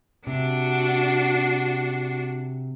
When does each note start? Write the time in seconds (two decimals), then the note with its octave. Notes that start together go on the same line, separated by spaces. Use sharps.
0.27 C3 D4 F#4